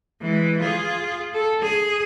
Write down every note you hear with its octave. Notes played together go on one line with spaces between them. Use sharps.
E3 G#3
F4 G#4
A4
G#4